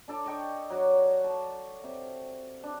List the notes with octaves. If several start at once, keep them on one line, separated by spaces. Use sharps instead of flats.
D4 A4 D5
D5 D#5 G5 C#6
F#3 F#4 D5
A5
C3
D4